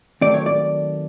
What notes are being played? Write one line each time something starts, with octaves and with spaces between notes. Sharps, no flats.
D#3 F#3 A3 C4 D5
C#5
D5